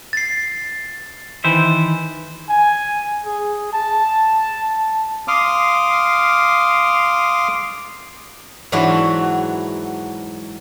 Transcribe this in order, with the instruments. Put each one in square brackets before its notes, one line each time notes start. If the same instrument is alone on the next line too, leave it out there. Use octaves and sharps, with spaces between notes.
[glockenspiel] A6 C7
[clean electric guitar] D#3 E3 C5 E5
[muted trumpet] G#5
G#4
A5
[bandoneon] F5 C6 D6 D#6 F6
[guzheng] G#2 E3 F#3 D4 E4 F#4